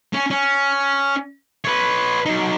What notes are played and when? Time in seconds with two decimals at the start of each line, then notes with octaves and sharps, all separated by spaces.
0.14 C#4
0.30 C#4
1.65 B4 C#5
2.26 F#3 D#4